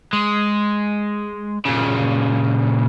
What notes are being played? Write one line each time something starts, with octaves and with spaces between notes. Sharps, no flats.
G#3
A#2 C#3